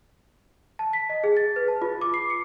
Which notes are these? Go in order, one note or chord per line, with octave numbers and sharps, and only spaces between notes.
A5
B6
D#5
G#4
A6
B4
A5
F4
D6
C7
C#7